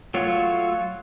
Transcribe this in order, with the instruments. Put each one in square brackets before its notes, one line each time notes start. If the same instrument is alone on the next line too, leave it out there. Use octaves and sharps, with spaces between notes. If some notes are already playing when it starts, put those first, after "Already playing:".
[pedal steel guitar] F#3 A3 F4 C#5